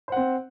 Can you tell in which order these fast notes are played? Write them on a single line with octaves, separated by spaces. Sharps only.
C5 F#5 C4